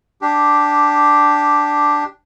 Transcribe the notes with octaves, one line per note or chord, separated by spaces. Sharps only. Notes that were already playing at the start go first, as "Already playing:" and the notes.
D4 G4